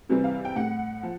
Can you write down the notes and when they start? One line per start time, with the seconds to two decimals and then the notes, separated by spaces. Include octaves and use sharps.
0.09 C3 E3 G3 C4
0.24 F5
0.45 G5
0.56 A2 F#5
1.03 F3